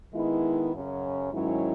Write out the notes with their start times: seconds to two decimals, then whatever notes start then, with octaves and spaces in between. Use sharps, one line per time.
0.13 D#3 G#3 B3 E4
0.72 F#2 C#3 F#3 C#4
1.31 G#2 D#3 F#3 C#4 E4